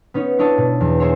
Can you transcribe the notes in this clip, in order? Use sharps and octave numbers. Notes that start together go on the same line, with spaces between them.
B3 C#4 D#4 C#5
D4 E4 C#5 D#5 A5
B2
E2
B3 E4 G#4 C5 C#5